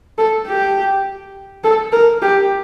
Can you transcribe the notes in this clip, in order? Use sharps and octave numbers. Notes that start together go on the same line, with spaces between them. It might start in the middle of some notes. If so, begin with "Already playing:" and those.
A4
G4
A4
A#4
G4